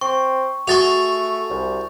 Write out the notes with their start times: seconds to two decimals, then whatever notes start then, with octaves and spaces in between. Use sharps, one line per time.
0.01 C4 C#6
0.67 A3 F#4 G#4 C#6 A6 F7
1.50 C2